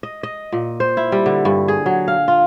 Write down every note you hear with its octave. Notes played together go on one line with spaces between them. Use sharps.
D#5
D#5
A#2
C5
E4
G3
D3
G2
G#4
F#3
F5
F4